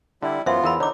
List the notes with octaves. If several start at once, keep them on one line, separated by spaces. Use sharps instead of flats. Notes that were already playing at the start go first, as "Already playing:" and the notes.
D3 G3 E4
F#2 E3 B3 F4 C5 E5
E2 E4 A#4 B5
D3 D#4 C#5 D6